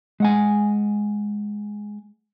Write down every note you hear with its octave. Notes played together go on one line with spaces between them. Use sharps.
G#3 F#5 G#5